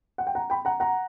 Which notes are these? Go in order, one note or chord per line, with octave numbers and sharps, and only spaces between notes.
F#5
G5
F#5 A#5
G5 B5
F#5 A#5
F#5 A#5